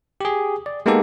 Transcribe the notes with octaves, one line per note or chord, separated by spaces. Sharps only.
G4 G#4
D5
G#3 A#3 B3 D#4 G4 A4